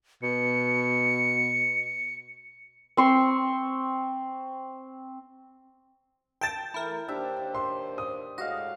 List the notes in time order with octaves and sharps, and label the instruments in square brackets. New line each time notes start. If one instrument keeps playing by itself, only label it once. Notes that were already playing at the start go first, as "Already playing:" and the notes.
[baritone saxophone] B2 [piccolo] C#7
[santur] C4 C6 C#6 E6
[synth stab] G5 A5 [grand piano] G6 A6
[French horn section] E3 A3 [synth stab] E4 A#4
[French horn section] D#2 C5 [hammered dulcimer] D4 G4 E5
[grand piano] C6
D#6
[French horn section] A2 G#3 [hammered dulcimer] F#4 F5 [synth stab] D#5